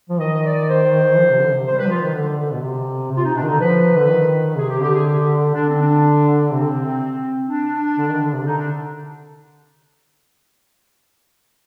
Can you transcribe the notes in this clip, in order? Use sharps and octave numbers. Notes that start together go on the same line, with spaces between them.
F3
D#3 D#5
D5
C5
F3
C3
D3
C3
C5
G3
B4
F3 F4
D#3
D3
D3
B2
C3
C3
F4
C3 D#4
B2 D4
D#3
D3 D#4
F3 B4
D3
D#3
C3 G#4
G4
D3 G4
G#4
G4
D3 D4
C4
D4
C3 C4
D3
C3
D4
D3
D#3
D3
C3
D3 D#4
D4